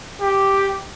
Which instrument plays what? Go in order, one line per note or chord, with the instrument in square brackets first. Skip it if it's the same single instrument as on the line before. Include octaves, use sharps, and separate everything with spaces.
[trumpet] G4